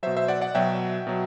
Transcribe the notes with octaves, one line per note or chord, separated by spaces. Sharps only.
B2 F#3 C5 E5
C5 E5
D5 F#5
D5 F#5
B2 F#3 E5 G5
B2 F#3